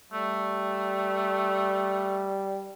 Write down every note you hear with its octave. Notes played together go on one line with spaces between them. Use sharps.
G3 A3